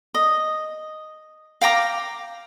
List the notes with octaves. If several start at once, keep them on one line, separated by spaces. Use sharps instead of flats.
D#5
F5 G5 A#5 D6